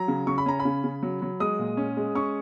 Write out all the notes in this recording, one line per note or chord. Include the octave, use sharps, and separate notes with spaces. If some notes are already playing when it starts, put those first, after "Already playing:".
Already playing: F#3 A#5
C#3
C#3 C#6
B5
C#4 A#5
B5
C#3
C#3
F#3
F#3
G#3 D#6
A#2
C#4
G#3
C#4 C#6